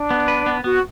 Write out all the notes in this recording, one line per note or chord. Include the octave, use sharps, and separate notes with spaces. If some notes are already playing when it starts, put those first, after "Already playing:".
Already playing: D4
B3
B4
B3
B3 F#4